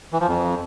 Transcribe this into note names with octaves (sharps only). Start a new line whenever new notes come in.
E3
F3
F2